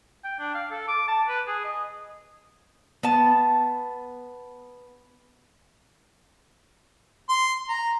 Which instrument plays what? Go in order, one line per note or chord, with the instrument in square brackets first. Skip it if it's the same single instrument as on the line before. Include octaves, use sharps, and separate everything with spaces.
[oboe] G5
D4
F5
A4
D6
A5
B4
G#4
D#5
[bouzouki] B3 A5
[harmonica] C6
A#5